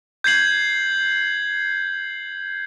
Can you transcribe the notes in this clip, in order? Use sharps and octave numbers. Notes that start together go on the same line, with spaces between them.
G6 G#6 C7 F#7